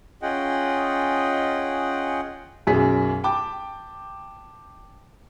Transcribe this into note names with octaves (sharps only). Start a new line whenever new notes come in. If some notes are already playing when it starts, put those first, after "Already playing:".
C#4 F4 G#4 D#5 F#5 G5
B1 F#2 G#4 B6
G5 A5 D6